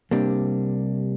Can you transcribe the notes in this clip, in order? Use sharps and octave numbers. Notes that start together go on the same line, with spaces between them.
C3 G3 A#3 D4